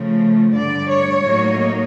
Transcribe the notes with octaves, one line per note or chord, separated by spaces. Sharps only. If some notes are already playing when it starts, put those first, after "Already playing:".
Already playing: C#3 F3 A3
G2 D3 G3 D5
C#5
A2 F#3 A#3 D#4